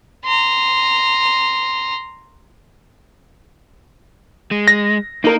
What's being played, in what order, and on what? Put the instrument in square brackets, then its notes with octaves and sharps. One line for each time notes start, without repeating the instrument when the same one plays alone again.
[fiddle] A#5 C6
[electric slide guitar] G#3
[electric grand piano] A#6
[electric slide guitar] A#3 [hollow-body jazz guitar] D#4 A#4